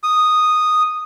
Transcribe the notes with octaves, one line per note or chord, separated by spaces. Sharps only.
D#6